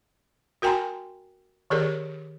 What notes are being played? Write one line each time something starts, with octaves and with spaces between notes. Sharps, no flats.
F#4 A#4 G5 G#5 A#5 C6
D#3 G4 G#4 A#4 D5